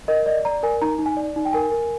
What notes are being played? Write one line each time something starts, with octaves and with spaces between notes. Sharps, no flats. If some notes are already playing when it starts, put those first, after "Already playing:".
A#4 D#5
D5 D#5
D5 A#5
A#4 G#5
D#4 A#5
D#4
G#5
D5
D#4
G5
A#4 G#5
A#4